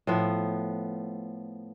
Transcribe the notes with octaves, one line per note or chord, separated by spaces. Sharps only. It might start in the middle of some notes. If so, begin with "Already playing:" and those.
A2 F3 B3